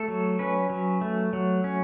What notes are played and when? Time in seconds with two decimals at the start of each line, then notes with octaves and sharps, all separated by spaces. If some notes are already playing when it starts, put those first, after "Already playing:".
Already playing: A3 A4
0.08 F#3
0.39 C#4 B4
0.70 F#3
1.01 A3
1.33 F#3
1.64 C#4